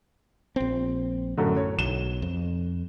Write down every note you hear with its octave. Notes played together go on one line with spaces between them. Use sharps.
A#1 C4
F#2 A2 D3
C#5
B1 E7 G7
F2